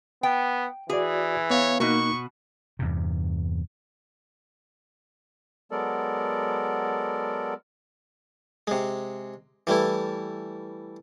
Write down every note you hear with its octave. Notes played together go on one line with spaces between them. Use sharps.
B3 G5
E3 F#4 G#4 D5
B3 C#5 F5
B2 A#3 D#4 F#4 C#6
E2 G2 C3
F#3 G#3 B3 A4 A#4 D5
C3 G#3
E3 G3 A3 E4